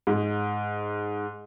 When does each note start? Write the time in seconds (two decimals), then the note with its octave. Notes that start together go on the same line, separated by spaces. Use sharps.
0.07 G#2